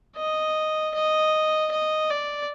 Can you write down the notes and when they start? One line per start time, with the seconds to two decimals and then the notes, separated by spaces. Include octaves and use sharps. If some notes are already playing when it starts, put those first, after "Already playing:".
0.17 D#5
0.94 D#5
1.71 D#5
2.10 D5